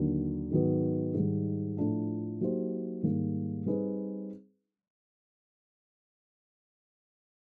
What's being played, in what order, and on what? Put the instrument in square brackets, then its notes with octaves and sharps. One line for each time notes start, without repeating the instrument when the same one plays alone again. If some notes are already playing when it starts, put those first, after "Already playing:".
Already playing: [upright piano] D#2 D3 F#3
G#2 D#3 F#3 B3
G#2 D#3 G3
A2 F3 A3 D4 F4
F#3 A#3 D#4 G4 C5
G#2 D#3 G3 A#3
G3 C4 D#4 G#4 B4